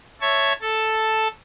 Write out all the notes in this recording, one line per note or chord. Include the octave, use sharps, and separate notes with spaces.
C#5 E5 A5 C#6 G#6
A4 A5